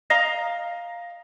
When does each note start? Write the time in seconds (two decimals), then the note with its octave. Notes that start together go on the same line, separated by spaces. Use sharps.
0.10 D#5 F5 A#5